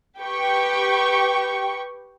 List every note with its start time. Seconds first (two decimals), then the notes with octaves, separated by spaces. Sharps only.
0.19 G4 B4 G5 C#6